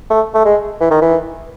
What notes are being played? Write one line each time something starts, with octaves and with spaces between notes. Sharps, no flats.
A3
A3
G#3
E3
D#3
E3